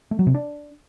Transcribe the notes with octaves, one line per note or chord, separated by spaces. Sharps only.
A3
F#3
C3
D4